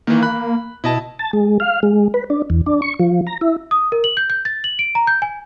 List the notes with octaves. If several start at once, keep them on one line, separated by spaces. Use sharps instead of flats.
D#3 E3 A#3
B5 F#6
B2 E4 D#5 A5
A5
G#3
F5
G#3
B4
D4
E2
D4
C#6
F3
A#5
E4
D#6
A#4
F#7
G6
G6
A6
F#7
D7
A#5
G6
G#5